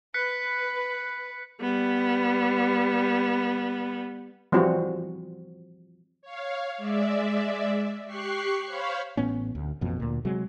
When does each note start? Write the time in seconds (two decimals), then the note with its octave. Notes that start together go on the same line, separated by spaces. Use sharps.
0.14 B4 F#6 B6 C#7
1.61 G3 B3
4.52 E3 F3 G3 C4 F#4
6.22 C#5 F5
6.78 G#3 D5 E5
8.06 G4 C#6 F#6 C7
8.66 C5 C#5 F5 B5 C#6
9.17 A1 A2 B3 C#4
9.55 D2
9.81 A1 F2 B2
10.00 D2 A#2
10.25 C3 F#3 G#3